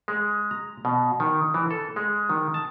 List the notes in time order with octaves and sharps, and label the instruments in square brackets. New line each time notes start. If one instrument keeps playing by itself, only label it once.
[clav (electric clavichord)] G#3
A#5
B2
D#3
E3
A4
G#3
D#3
A5